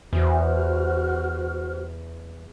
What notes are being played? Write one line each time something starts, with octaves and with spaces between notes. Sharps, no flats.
E2 F#4 C5 F6